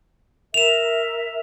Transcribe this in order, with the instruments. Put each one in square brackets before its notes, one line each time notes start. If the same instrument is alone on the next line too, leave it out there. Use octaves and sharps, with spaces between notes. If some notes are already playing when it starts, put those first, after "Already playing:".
[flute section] A#4 E5 [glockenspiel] E7 F7